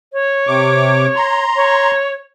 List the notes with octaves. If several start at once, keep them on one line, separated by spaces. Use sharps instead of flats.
C#5
C3 D6
A#5 C6
C#5